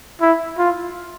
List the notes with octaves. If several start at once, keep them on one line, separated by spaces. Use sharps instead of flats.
E4
F4